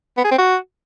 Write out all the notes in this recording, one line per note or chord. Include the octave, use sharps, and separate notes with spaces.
B3
G#4
C4
F#4